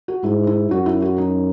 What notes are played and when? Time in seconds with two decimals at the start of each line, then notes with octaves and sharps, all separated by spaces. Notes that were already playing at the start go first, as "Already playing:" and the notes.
0.08 F#4
0.24 G#2 E4
0.47 E4
0.70 F#2 F#4
0.86 E4
1.02 F#4
1.18 D#4